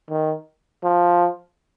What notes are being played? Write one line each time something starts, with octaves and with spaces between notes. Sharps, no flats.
D#3
F3